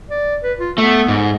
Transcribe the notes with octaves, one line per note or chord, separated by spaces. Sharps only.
D5
B4
F4
A3 B3
G#2